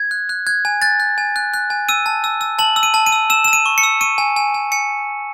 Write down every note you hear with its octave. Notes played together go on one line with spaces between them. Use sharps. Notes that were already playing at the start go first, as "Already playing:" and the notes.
Already playing: G#6
F#6
F#6
F#6 G#6
G#5
F#6 A6
F#6
G#5
F#6
F#6
G#5
E6 D#7
A5
E6
E6
A5 F#7
E6
D#7
A5
D#7
E6
E6 E7
E6 E7
D#7
C#6
C#7
E6
C#6 D#7
G#5
G#5
G#5
G#5 C#7